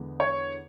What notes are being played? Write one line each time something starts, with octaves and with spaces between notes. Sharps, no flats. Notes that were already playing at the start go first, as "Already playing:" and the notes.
Already playing: E2 D3 G#3 B3
C#5